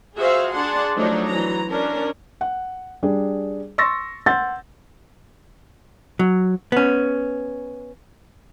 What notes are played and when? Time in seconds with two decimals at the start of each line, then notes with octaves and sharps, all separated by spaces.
0.16 F4 F#4 G#4 C5 E5 F5
0.53 D4 G#4 D5 F#5 A5 C6
0.97 F3 F#3 A3 D4 D#4 C#5
1.29 E3 F#3 A#5
1.70 C#4 D4 A#4
2.41 F#5
3.03 G3 D4 G#4
3.78 C6 C#6 E6 A6 A#6
4.26 F#5 C6 E6 G6 A6
6.19 F#3
6.72 B3 C#4